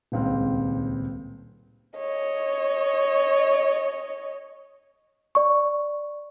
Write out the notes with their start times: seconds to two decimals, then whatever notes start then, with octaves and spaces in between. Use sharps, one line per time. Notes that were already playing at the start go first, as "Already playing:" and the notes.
0.12 D#1 C#2 C4
1.97 C#5 D#5
5.35 D5 C#6